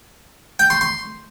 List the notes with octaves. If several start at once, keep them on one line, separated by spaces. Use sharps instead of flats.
G5
C6
C6